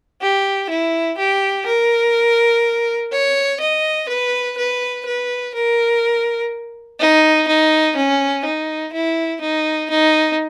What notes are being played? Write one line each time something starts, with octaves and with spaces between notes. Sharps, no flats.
G4
E4
G4
A#4
C#5
D#5
B4
B4
B4
A#4
D#4
D#4
C#4
D#4
E4
D#4
D#4